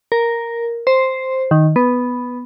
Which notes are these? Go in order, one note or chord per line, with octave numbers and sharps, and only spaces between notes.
A#4
C5
D#3
B3